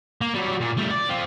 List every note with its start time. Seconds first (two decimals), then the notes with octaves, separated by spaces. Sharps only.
0.21 A#3
0.34 F#3 G3
0.61 A#2
0.77 G3 A3
0.91 D5
1.09 C4 F4